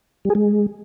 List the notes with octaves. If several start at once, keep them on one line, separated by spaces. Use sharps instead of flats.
G3
G#4
G#3